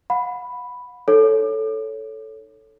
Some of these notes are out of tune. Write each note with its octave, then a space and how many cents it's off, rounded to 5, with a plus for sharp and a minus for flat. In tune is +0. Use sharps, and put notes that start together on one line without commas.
F#5 -35 B5 +0
D#4 -20 A4 +0 C#5 +0